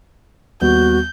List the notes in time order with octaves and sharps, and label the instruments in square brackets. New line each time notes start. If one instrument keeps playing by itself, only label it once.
[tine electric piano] D#2 G3 B3 [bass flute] F#4 [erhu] G6